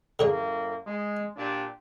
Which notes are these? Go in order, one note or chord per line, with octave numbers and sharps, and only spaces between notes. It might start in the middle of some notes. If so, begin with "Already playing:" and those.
F#2 A2 D3 A#3 G#4 C#5
G#3
A#2 D4 G4